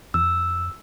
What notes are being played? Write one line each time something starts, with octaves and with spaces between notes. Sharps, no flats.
F2 E6